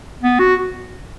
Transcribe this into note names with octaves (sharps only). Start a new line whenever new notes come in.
B3
F#4